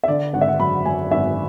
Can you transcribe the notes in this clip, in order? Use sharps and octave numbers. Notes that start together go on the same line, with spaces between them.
E5
D3 D5
G#1 F#5
E5
F#5
F#2 B5
F#2 G#5
G#1 E5